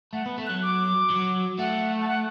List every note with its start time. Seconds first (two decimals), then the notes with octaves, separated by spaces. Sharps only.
0.13 A3 F#5
0.26 B3
0.38 A3
0.46 F#3 F#6
0.62 D6
1.10 F#3
1.59 A3 F#5
2.01 A5
2.08 F#5